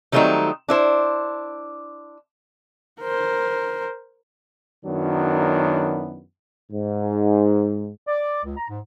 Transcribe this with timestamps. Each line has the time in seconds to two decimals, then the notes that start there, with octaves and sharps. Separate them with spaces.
0.12 D#3 F#3 G3 A3 C4 D#4
0.69 D4 E4 C5
3.00 A#4 C5
4.85 F#2 D#3 F#3 B3 D4 E4
6.72 G#2
8.08 D5
8.44 C#2
8.57 A#5
8.69 G#2